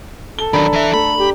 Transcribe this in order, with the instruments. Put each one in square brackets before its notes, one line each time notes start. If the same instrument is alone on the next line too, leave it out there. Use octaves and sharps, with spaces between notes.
[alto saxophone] A4 [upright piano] G7
[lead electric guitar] D#3 F#3 [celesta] D4 D5 A#5 [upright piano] B5
[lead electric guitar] E3 E5
[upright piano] A3 [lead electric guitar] B5
[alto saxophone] G4